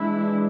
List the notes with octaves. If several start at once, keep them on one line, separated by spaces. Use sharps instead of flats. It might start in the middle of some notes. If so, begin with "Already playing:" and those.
Already playing: E3 G#3 D4 E4